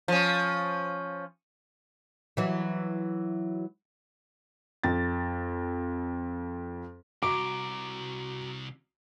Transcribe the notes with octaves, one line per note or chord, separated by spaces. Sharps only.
F3 C#4
E3 F#3
F2 A6
C2 F#4 A#5 D6 D7